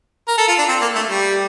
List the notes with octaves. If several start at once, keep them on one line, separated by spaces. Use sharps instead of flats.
A#4
A4
F4
D4
C4
A#3
A3
G3